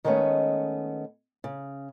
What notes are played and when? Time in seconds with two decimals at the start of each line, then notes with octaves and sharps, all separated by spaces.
0.05 D#3 G#3 A3 B3 C#4
1.44 C#3